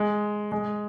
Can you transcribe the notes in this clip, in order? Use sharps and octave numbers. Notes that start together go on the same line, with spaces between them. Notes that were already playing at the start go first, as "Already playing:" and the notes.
Already playing: G#3
G#3